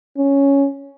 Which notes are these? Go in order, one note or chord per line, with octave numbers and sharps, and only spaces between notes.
C#4